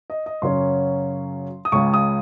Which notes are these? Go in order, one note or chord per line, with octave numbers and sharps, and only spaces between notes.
D#5
D#5
F#2 C#3 F#3 C#4 C6
D#6
C#2 C#3 G#3 C#6
D#6